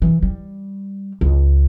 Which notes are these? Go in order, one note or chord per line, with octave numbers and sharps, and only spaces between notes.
E3
G3
C#2